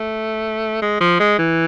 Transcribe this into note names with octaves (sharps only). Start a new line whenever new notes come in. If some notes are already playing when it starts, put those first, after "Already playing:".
Already playing: A3
G#3
F3
G#3
E3